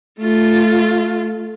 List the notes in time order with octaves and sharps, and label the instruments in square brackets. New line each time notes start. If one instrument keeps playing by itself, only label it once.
[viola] A3 F4